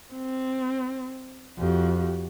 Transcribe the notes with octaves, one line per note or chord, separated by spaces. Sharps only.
C4
F2 F#4 G4